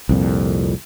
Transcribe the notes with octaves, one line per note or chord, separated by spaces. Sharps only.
C2 F2 A#2